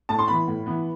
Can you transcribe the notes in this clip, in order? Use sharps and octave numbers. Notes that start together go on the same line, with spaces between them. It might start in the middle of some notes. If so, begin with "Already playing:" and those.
A2 A5
C6
E3 B3 B5
A2
E3 B3